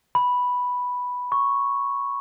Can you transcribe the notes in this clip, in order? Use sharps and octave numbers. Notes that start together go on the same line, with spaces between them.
B5
C#6